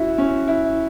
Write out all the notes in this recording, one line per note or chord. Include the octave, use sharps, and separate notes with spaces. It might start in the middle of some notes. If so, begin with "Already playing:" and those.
Already playing: C#4 E4 F#4
C#4
E4